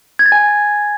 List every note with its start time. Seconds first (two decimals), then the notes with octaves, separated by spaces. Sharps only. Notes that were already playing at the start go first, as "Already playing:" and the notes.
0.19 G#6
0.26 A6
0.32 G#5